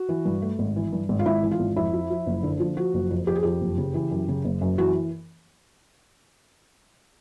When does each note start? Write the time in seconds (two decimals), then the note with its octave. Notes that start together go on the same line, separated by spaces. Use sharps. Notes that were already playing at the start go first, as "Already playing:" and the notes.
Already playing: F#4
0.09 E3
0.25 G2
0.42 A3
0.59 G#1
0.76 E3
0.93 G2
1.09 G#1
1.19 F4
1.26 G#1 E4
1.43 E3
1.51 F4
1.60 G#1
1.76 F2 E4
1.93 F3
2.11 F3
2.26 F#1
2.43 D3
2.60 F3
2.77 F3 F#4
2.94 F#1
3.10 F2
3.27 F2 G4
3.35 G#4
3.43 F2 G4
3.61 F#1
3.78 C#3
3.94 E3
4.11 F#2
4.28 C#3
4.44 F#1
4.61 F#2
4.78 E3 F#4